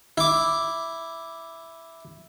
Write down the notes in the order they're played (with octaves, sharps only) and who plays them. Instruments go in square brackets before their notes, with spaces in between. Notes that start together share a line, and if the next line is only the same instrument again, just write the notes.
[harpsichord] E4 D6